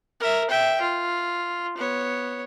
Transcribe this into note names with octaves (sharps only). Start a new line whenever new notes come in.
A#4 E5
E5 G5
F4
B3 C#5